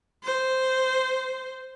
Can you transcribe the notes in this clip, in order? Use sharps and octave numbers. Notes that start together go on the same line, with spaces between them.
C5